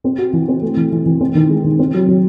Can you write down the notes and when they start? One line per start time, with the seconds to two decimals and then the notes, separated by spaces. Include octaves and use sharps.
0.04 C4
0.18 F#4
0.33 E3
0.48 C4
0.62 A3
0.77 E3
0.92 E3
1.06 E3
1.20 C4
1.35 D#3
1.50 G#3
1.64 D#3
1.79 C4
1.94 F#3
2.08 F#3